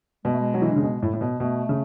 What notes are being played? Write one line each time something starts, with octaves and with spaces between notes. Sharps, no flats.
B2 G#3
A3
G#3
F#3
E3
D3
C#3
B2
A2
A2
B2
B2 A3
C#3